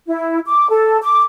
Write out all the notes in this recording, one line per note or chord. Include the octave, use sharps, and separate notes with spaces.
E4
D6
A4
D6